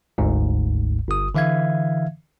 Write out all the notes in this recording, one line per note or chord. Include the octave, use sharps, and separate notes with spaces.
G1 D2 G#2
G1 D#6
D3 E3 E5 F5 G#6